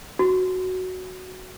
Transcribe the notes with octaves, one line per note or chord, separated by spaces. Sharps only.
F#4